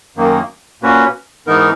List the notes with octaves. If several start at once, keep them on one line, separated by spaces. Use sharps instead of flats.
F#2 D#3 A#3
A#2 A#3 C#4 F#4 B4
G#2 E3 B3 D#4 A#4